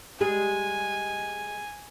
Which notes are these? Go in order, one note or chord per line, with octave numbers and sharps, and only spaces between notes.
G3 G#3 G#4 G#5